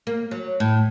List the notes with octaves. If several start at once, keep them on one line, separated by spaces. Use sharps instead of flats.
A#3
F#3
A2